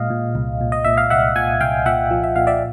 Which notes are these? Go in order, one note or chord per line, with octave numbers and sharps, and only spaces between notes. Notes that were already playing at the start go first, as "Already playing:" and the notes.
Already playing: A#2 G#3 D#5 F5
A#2
C2
A#2
D#5
A#2 E5
F5
C2 E5 F#5
A#2 F#5 G#5
C2 F5 G5
A#2 E5 F#5
F3
E5
A#2 F5
D5 E5